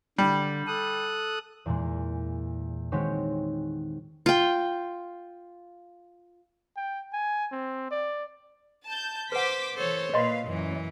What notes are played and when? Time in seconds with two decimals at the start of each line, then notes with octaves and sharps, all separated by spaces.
0.18 D3 G3
0.67 A4 D#6 F#6
1.66 E2 A#2 G#3
2.92 D#3 G#3 C4 F#4 G4 C#5
4.26 F4 G5
6.77 G5
7.13 G#5
7.52 C4
7.91 D5
8.86 A5 G6
9.32 B4 C5 F#5 D6 B6
9.77 E3 A4 C5 C#5
10.14 A#2 B4 D#5 F5 C6
10.48 F#2 A#2 E3